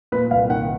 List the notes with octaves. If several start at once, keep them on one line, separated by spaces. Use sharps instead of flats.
A#2 B4
C2 F5
D#3 F#5